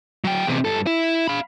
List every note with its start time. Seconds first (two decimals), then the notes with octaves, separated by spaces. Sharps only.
0.24 F#3 G5
0.47 E2 C3
0.65 G2 A4
0.87 E4
1.28 F5 B5